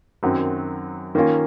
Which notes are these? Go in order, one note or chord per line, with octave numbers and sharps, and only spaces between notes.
F#2 D#3 F#3 C4
D#3 A#3 C#4 F4